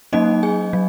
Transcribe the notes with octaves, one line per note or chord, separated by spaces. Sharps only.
F#3 A#3 C#4 D#4 D#5
G#4 G#5
F#3